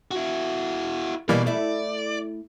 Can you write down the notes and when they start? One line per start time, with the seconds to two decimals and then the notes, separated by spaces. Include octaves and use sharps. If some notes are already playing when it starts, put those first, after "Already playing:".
0.11 E4 F#4
1.29 B2 E3 G3 A#3 D#4 D5
1.47 A3 E4 D5